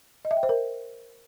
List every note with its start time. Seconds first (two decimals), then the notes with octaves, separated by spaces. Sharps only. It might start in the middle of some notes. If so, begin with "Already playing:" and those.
0.25 D#5
0.31 E5
0.37 G5
0.43 C5
0.49 A#4